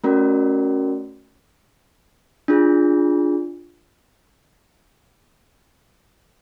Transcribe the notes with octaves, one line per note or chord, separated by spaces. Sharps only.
A3 C#4 F#4 A#4 D5
D4 F4 G#4